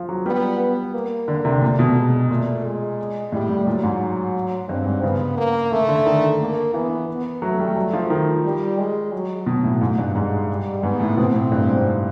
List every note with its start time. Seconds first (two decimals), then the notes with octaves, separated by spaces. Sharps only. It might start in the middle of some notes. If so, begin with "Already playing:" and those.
Already playing: F3
0.09 F#3
0.26 G3 B3
0.60 B3
0.94 A#3
1.28 D3
1.45 C3
1.61 A#2 A3
1.79 B2
1.96 G#3
2.30 A#2 A3
2.65 G#3
3.32 A2 G3
3.49 A2
3.67 A#2 F#3
3.83 G#2
4.69 G2 C4
4.86 G#2
5.03 C#3 B3
5.37 A#3
5.71 C#3 A3
5.88 D3
6.06 D#3
6.40 A#3
6.74 E3 B3
7.09 B3
7.42 F#3 A3
7.59 G3
7.77 F#3
7.93 F3
8.10 D#3
8.44 G3
8.78 G#3
9.12 F#3
9.46 B2
9.64 A2
9.81 G#2
9.98 G2
10.16 G#2 G#3
10.50 G3
10.83 G#2 B3
11.00 A2
11.17 B2 C4
11.35 A2
11.52 G2
11.69 G#2